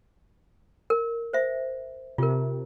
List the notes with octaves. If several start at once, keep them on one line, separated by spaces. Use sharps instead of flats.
A#4
C5 E5
C3 F4 A#4